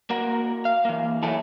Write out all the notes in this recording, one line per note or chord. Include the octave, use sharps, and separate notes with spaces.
A#3 F#4 A#4
F5
E3 A#3
E3 F#3 A3 E4 G#4 A4